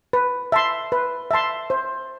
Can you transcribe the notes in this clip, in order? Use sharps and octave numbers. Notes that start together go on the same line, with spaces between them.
B4
E5 A5 C6
B4
E5 A5 C6
C5